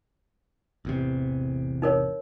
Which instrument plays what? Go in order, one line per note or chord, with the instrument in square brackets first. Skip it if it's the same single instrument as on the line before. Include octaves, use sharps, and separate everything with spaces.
[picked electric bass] A1 E2 C3
[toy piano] D#4 A#4 C#5